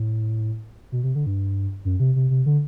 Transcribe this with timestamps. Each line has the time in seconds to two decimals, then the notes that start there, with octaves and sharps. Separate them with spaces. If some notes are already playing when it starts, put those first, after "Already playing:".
Already playing: A2
0.92 B2
1.03 C3
1.15 D3
1.26 G2
1.85 F#2
2.00 C3
2.16 C3
2.30 C3
2.46 D3